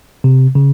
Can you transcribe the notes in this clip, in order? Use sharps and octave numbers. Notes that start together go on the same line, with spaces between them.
C3
C#3